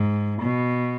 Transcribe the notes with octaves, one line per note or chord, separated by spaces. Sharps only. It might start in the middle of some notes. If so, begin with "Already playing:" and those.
Already playing: G#2
B2